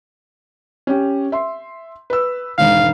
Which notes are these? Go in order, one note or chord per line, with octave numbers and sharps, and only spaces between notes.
C#4 G4
E5 C6
B4 E6
E1 G#2 D#3 F5